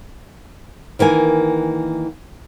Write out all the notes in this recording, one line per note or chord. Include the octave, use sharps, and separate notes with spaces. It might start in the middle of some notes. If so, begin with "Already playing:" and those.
D#3 E3 A#3 G#5